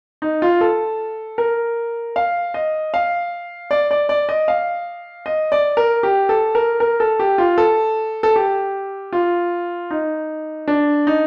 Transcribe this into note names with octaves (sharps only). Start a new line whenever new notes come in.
D#4
F4
A4
A#4
F5
D#5
F5
D5
D5
D5
D#5
F5
D#5
D5
A#4
G4
A4
A#4
A#4
A4
G4
F4
A4
A4
G4
F4
D#4
D4
D#4